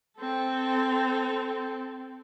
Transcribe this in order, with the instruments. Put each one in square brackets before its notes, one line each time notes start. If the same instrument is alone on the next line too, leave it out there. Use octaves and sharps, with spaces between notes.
[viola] C4 A4